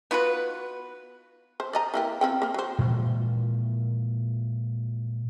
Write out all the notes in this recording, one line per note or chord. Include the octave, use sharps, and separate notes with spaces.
B3 F4 F#4 B4
C5
D5 D#5 A#5
E3 A#3 G4
F3 C4 G5
A#3 C4
F#3 C5
A#2 E3 F3 G#3